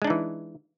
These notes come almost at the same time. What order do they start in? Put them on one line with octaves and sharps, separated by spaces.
G#3 D4 D#4 E3